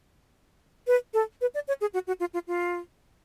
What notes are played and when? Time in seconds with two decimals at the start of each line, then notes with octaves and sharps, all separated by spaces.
0.87 B4
1.14 A4
1.41 B4
1.54 D5
1.68 C#5
1.81 G#4
1.94 F#4
2.07 F#4
2.20 F4
2.34 F4
2.47 F4